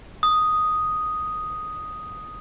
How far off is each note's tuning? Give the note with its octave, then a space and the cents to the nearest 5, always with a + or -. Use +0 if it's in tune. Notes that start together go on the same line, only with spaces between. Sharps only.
D#6 +0